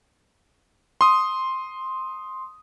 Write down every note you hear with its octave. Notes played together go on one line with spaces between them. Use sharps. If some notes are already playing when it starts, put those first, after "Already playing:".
C6 D#6